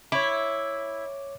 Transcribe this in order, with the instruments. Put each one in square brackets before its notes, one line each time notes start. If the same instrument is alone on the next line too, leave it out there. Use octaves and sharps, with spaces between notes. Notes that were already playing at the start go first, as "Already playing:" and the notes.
[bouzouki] E4 [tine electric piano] C#5 D6